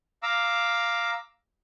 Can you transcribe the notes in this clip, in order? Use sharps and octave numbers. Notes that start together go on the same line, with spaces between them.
F5 A#5 D6 E6